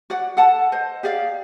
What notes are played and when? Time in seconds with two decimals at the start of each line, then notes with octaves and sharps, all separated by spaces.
0.10 F#4 D5 F#5
0.37 A4 F#5 A5
0.72 C5 D#5
1.03 G4 G#4 D5 F5